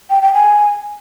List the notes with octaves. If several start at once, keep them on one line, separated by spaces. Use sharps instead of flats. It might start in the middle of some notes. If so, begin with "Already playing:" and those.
G5
G5
G#5